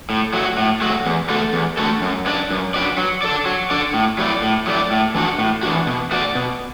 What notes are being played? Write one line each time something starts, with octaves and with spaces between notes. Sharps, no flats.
A2
F#3 A3 F#4
A2
F#3 A3 F#4
E2
D3 A3 F#4 A4
E2
D3 A3 F#4 A4
F#2
F#3 D4 B4 D5
F#2
F#3 D4 B4 D5
F#3
D4 A4 D5
F#3
D4 A4 D5
A2
F#3 A3 E4 D5
A2
F#3 A3 E4 D5
A2
E3 D4 F#4
A2
E3 D4 F#4
B2
A3 F#4 D5
B2